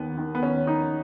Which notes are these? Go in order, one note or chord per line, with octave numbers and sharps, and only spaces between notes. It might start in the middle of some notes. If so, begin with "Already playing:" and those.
Already playing: D#2 D#3 B3
D#3
B3
D#2 C#4
D#3 D#4